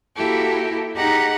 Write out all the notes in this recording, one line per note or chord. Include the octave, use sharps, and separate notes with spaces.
A#3 E4 F#4 G4 A4
D#4 G4 G#4 F#5 A#5